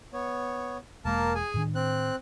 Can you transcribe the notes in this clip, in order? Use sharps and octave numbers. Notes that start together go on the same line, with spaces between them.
B3 C#5
E1 G#3 A#3 A#4 A5
G#4 G#5
A2 D#3 D4
C4 F#6